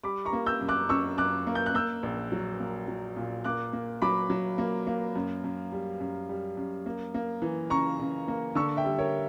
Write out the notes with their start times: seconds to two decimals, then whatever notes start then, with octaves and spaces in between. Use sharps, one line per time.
0.04 G3 B5 D6
0.25 A#5 C#6
0.33 A#3
0.46 E6 G6
0.61 F#2
0.69 D6 F#6
0.89 F#2 C#6 E6
1.18 F#2 D6 F#6
1.47 A#3
1.55 G6
1.66 F#6
1.74 A#3 E6 G6
2.03 A#1
2.32 F#3
2.60 A#3
2.88 F#3
3.16 A#2
3.44 A#3 D6 F#6
3.73 A#3
4.02 F#3 B5 D6
4.30 F#3
4.58 A#3
4.87 A#3
5.15 F#2
5.44 F#2
5.72 G3
6.00 F#2
6.29 G3
6.57 F#2
6.86 A#3
7.14 A#3
7.42 E3
7.70 C#3 A#5 C#6
8.00 C#3
8.28 A#3
8.55 D3 C#6 E6
8.77 E5 G5
8.85 G3
8.98 A#4 C#5